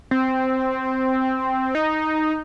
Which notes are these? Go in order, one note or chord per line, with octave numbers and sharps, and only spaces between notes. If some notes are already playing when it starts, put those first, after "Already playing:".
C4
D#4